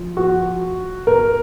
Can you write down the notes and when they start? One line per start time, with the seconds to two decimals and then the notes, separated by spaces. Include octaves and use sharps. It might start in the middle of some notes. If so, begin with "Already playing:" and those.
Already playing: F3
0.17 F#4
1.07 A#4